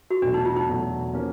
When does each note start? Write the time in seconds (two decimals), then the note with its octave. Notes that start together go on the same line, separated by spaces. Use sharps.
0.10 F#4
0.22 E2 B2 F#3 A3 D4
0.34 D#4
0.45 F4
0.56 D#4
0.68 E2 B2 F#3 A3
1.14 F3 A#3 C#4 F#4